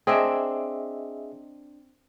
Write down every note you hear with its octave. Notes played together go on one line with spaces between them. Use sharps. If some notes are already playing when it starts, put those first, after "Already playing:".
C4 D4 G#4 D#5 E5